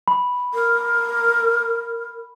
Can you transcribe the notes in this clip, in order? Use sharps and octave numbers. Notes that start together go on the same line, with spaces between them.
B5
A#4